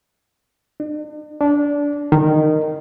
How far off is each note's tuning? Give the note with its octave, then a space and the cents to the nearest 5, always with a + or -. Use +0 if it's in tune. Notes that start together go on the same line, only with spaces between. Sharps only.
D4 +45
D4 -20
D#3 -15